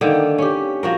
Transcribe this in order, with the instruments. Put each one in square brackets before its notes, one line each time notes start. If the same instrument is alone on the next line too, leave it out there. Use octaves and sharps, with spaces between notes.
[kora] D3 D#3 A#3
C#4 G4
F3 F#4 A#4